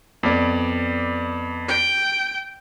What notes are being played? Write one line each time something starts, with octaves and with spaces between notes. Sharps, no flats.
F2 B3 D5
G5